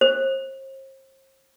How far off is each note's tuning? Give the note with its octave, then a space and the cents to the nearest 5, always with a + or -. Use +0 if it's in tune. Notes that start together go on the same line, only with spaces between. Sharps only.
C5 +40